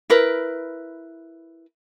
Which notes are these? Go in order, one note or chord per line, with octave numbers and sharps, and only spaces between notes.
E4 A#4 B4